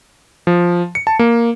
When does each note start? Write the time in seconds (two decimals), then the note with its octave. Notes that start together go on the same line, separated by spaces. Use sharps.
0.47 F3
0.95 C#7
1.07 A5
1.19 A#3